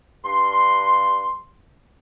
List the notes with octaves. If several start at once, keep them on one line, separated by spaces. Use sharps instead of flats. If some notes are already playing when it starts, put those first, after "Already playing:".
G2 C6